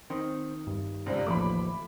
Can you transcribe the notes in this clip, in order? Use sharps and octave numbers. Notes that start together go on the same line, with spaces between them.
D#3 C4
G2
C#2 C3 D5
A1 D#2 F3 A3 B5 D6